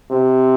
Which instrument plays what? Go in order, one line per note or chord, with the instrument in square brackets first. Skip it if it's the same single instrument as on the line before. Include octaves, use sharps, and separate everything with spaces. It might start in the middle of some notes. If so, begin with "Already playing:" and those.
[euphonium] C3